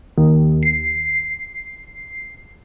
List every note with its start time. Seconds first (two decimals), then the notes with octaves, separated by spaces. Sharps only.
0.18 D#2
0.63 C7